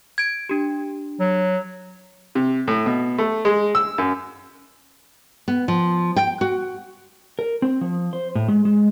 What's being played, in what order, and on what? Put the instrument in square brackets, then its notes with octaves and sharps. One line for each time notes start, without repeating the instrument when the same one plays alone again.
[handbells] G#6 D7
D4 G4
[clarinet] F#3
[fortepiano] C3
A2
B2
A3
G#3
E6
F#2
[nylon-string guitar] B3
F3
G5
F#4
[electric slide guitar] A#4
C4
F3
C5
A2
G#3
G#3